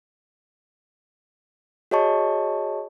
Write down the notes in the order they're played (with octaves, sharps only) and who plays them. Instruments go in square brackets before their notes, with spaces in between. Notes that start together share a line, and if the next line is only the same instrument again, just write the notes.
[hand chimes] F#4 G#4 C#5 D#5 A5 C#6